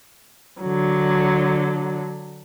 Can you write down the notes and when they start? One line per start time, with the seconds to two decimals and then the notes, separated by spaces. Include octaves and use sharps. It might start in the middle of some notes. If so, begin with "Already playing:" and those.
0.61 D3 F#3